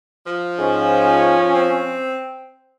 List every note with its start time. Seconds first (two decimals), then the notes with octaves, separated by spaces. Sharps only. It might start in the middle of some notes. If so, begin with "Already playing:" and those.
0.26 F3
0.59 G#2 C#4
1.54 C4